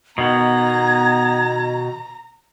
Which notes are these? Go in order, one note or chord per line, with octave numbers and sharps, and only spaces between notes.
B2 D#3 B3 A#5 G#6